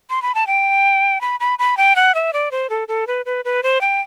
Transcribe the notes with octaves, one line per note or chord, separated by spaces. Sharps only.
C6
B5
A5
G5
B5
B5
B5
G5
F#5
E5
D5
C5
A4
A4
B4
B4
B4
C5
G5